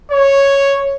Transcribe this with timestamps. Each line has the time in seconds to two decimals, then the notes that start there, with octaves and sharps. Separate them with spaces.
0.12 C#5